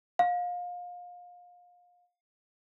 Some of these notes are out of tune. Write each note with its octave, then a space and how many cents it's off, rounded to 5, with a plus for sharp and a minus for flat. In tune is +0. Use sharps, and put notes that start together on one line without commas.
F5 +30